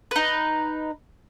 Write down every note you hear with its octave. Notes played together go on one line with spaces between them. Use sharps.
D#4 B4